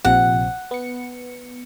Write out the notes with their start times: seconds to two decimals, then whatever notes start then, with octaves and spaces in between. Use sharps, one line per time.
0.05 A#1 C3 F3 F#5
0.71 B3 C#7